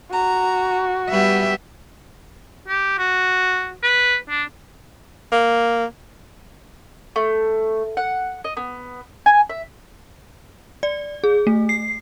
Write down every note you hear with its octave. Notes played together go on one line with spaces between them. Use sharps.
F#4 A#5
G3 B3 G4 E5
G4
F#4
B4
D4
A#3
A3
F#5
D#5
B3
G#5
E5
D5
G#4
A3
C7